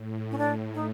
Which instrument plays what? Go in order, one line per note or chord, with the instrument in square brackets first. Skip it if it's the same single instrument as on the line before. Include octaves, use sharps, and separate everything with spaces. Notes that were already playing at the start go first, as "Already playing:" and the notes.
Already playing: [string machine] A2
[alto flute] C#4
D4
D#4